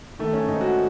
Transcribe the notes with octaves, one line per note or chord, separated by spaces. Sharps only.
D#3 A3
C#4
G#2 D#4
F#4